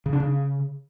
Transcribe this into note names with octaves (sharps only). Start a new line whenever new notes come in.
C#3
D4
C#3